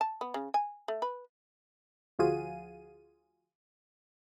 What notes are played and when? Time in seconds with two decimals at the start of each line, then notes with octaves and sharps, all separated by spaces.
0.01 A5
0.21 B3
0.34 C#3
0.54 G#5
0.88 A3
1.02 B4
2.19 D2 F3 F4 F#4 G#4 D#7